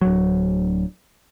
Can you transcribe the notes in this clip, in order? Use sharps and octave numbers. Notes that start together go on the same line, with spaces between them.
D1 F#3